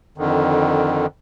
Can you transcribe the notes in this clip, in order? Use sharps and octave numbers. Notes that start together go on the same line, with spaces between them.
F2 D3 D#3